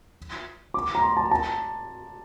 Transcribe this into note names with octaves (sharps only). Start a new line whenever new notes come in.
D6
A#5
C6
A5
A5